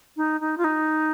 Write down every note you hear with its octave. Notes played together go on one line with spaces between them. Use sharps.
D#4
D#4
F4
D#4